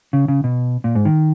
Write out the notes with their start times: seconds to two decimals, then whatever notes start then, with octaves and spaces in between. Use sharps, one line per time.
0.13 C#3
0.28 C#3
0.44 B2
0.84 A#2
0.95 G#2
1.05 D#3